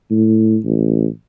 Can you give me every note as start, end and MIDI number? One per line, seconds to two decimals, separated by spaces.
0.10 0.58 45
0.64 1.07 33